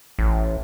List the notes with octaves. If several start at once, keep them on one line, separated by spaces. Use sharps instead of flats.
A1